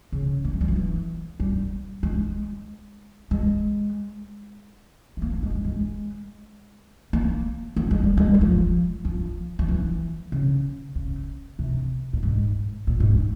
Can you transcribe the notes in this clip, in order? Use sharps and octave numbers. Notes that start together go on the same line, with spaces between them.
C#3
A#3
G#3
G3
F3
E3
G3
G#3
G#3
G#3
A#3
G#3
G#3
A#3
A#3
G#3
G3
G#3
G3
F3
F3
F3
E3
C#3
C#3
C3
A#2
G#2
A#2
G#2